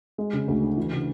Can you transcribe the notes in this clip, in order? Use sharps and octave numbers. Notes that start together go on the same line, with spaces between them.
G#3
C#3
D2
D4
E3
C#3